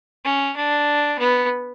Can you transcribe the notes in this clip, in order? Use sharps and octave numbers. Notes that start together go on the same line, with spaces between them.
C#4
D4
B3